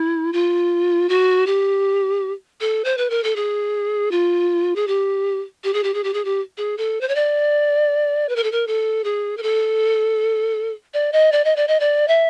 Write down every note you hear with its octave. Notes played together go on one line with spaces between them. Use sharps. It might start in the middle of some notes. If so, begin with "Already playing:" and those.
Already playing: E4
F4
F#4
G4
A4
C5
B4
A#4
A4
G#4
F4
G#4
G4
G4
G#4
G4
G#4
G4
G#4
G4
G#4
A4
C5
C#5
D5
B4
A#4
A4
A#4
A4
G#4
A#4
A4
D5
D#5
D5
D#5
D5
D#5
D5
E5